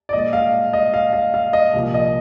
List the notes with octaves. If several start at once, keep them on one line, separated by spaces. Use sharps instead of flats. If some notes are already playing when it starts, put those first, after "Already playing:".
D5
A#2 G#3 D#5
F5
D#5
F5
F5
F5
D#5
C2 A#2 F3 A#3
D#5